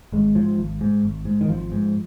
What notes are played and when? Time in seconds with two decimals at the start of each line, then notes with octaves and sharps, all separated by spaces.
0.12 G#1 G#3
0.35 G#2 F3
0.58 G#1
0.81 G#2
1.03 G#1
1.25 G#2
1.41 D#3
1.48 G#1 F3
1.72 G#2